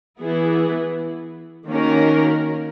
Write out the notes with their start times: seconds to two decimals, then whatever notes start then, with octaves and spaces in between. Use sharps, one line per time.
0.20 E3 B3 E4 G#4
1.68 D#3 A#3 C#4 F#4 A#4